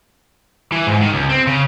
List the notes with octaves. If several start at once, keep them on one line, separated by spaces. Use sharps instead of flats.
E3
G#2
D#3
C#2
C4
C#3